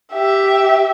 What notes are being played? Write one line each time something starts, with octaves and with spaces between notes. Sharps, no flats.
G4 E5